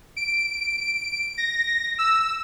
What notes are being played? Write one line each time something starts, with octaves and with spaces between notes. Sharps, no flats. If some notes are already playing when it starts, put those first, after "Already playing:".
D7
A#6
E6